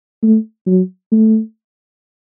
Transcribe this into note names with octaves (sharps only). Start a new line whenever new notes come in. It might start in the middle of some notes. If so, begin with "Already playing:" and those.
A3
F#3
A3